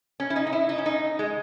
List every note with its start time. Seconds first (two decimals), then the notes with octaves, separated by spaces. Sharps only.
0.20 C#4
0.30 E4
0.36 D#4
0.47 D#4
0.53 E4
0.69 D#4
0.78 C#4
0.86 D#4
1.19 G#3